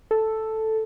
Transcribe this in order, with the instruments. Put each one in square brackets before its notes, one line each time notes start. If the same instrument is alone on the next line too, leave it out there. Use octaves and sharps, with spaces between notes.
[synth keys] A4